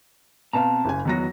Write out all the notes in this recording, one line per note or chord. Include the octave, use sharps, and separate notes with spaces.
B2 C4 B4 F5 A5 A#5
F#1 C#3 G#5
E2 D#3 F#3 B3 F#4 A#6